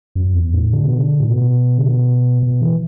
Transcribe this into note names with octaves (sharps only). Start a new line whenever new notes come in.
F#2
E2
A2
D3
B2
D3
A2
B2
D3
B2
B2
E3